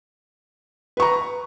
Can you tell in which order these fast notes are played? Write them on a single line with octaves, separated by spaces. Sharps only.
B4 C#6 A#5